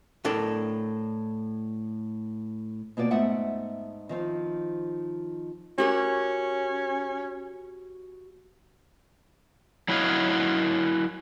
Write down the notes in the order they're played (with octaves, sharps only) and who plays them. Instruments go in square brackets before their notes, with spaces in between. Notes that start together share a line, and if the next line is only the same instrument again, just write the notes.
[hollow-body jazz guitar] A2 D4 A4 A#4 D5
[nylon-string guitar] B2 A#3 F#4 D5
G#2 A3 B3 E5 F#5
D#3 F3 C4
[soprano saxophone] C#4 [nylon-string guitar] F#4 G4 A#4
[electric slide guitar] F#3 E4 F#4 C#5 D#5 F5